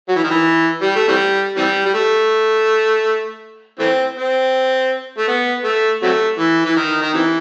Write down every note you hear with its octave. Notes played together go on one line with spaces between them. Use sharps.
F#3
E3
D#3
E3
G3
A3
C3 E3 G3
C3 E3 G3
G3
A3
E3 A3 C4
C4
A3
B3
A3
C3 F#3 A3
E3
E3
D#3
D#3
C3 E3